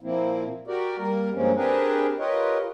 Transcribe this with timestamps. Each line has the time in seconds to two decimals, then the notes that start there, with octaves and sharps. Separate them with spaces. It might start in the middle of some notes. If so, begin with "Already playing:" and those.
0.01 A#2 F3 A#3 C4 E4
0.67 F#4 G4 A#4 D5
0.98 G3 A#3 A#4
1.34 G2 F3 G#3 A#3 C4 C#4
1.56 C4 D4 G4 G#4 A#4 B4
2.19 F4 G4 A#4 B4 C#5 D#5